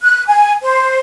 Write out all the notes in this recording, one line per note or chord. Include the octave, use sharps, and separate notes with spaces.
F#6
G#5
C5